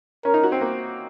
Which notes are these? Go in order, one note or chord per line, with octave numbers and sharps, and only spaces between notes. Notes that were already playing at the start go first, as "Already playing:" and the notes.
C#4 A#4
D#4
F#4
C4
A#3